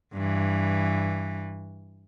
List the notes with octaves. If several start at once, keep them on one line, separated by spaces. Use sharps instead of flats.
G2 E3